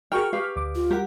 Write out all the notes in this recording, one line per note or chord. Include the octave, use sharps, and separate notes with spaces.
F#4 G#4 A#4 G5 C#6 F6
G4 B4 F5
D2 D6
F4
G3 G4 A#4 F#5